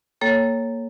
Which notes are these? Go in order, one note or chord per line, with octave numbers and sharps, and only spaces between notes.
A#3 A4 C#5 G5